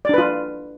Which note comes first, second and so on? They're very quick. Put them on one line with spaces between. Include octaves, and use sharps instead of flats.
D5 D4 B4 F4